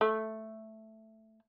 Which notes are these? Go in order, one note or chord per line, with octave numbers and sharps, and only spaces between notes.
A3